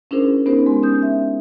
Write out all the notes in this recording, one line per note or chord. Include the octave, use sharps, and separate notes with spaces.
C#4 D4 E4 G#4 A#4 C5
B3 C#4 D#4 G4 A#4 C5
G#3 C6
C#4 D#6 G6
E5